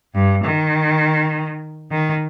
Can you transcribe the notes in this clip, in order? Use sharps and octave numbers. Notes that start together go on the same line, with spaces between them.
G2
D#3
D#3